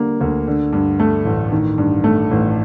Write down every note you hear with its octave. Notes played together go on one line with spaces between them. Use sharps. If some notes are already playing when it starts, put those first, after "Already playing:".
Already playing: D3 G3 A#3
D2
D3
G2
A3
A1
D#3
G2
A3
A1